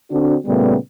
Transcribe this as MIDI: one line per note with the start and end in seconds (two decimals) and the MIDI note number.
0.12 0.36 50
0.12 0.36 60
0.12 0.36 62
0.12 0.36 66
0.46 0.75 46
0.46 0.75 49
0.46 0.75 55
0.46 0.75 57
0.46 0.75 59